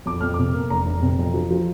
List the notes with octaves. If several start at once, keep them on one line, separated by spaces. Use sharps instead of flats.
F2 D6
F2 F6
C3 D6
A#3
F1 A#5
F1
C3
F2
F3
F3